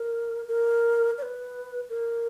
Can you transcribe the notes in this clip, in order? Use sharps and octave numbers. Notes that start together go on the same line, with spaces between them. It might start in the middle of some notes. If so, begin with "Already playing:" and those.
Already playing: A#4
A#4
D5
B4
A#4